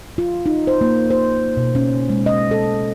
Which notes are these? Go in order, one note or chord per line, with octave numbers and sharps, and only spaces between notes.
F4
D#4
C5
A#3
C5
B2
C#4
G#3
D#5
A4